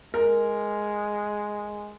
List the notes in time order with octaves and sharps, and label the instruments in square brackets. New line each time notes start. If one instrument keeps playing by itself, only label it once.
[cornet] G#3 [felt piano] A#4